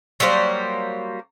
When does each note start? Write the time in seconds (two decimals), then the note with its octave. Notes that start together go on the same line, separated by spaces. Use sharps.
0.20 F#3 G3 A#3 C5